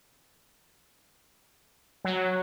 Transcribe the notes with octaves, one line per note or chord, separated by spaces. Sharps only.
F#3